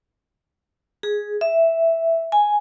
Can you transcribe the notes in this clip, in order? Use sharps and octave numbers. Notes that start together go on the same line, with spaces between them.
G#4
E5
G#5